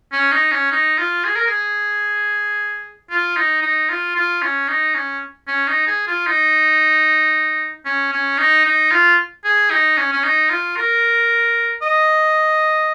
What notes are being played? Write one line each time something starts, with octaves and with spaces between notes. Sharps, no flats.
C#4
D#4
C#4
D#4
F4
G#4
A#4
G#4
F4
D#4
D#4
F4
F4
C#4
D#4
C#4
C#4
D#4
G#4
F4
D#4
C#4
C#4
D#4
D#4
F4
G#4
D#4
C#4
C#4
D#4
F4
A#4
D#5